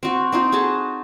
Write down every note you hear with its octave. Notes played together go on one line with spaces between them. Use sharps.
C4 F#4
C4 D#4 F4
F#4 G#4 A4 A5